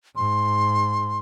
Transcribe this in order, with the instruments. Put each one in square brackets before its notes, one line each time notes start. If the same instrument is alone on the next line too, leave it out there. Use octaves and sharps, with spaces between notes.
[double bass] G#2 [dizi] C6